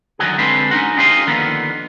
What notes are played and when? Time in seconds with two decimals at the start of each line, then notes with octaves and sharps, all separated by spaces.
0.19 D3 D#3 F#3 B3 F#4 G#4
0.38 D3 G3 G#3 C4 B4 C5
0.71 C#4 D#4 F#4
0.97 C#4 D#4 F4 G4 C5 D#5
1.27 D3 D#3 F3 A#3 B3